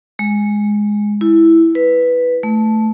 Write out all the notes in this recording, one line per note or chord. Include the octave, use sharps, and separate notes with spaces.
G#3
E4
B4
A3